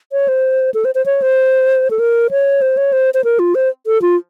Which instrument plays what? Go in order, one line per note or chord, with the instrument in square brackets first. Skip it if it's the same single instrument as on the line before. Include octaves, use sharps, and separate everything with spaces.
[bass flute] C#5
C5
A4
C5
C5
C#5
C5
A4
A#4
C#5
C5
C#5
C5
C5
A#4
F4
C5
A4
F4